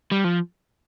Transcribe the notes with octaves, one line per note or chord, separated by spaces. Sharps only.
G3
F3